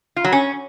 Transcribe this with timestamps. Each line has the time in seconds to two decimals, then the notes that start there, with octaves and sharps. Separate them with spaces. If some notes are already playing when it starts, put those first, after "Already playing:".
0.16 F4
0.25 F#3
0.33 C#4